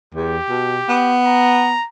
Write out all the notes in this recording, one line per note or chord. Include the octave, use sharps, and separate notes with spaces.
E2 G4
B2
B3
A#5